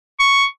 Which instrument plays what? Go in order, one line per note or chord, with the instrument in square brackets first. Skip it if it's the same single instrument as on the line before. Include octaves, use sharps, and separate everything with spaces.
[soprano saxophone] C#6